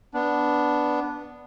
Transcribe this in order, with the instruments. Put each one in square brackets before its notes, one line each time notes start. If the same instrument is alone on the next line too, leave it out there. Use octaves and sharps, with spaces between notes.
[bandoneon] B3 D4